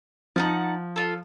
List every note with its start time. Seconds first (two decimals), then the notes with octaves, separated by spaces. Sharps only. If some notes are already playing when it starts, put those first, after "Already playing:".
0.36 F3 D#4 F#5 A5
0.96 F4 A4